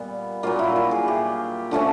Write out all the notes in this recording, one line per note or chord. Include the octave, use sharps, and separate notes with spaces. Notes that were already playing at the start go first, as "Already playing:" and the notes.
Already playing: A#2 G3 B3
A#2 F#3 A#3 F4
E4
F4
G#4
G4
D3 F3 A3 C#4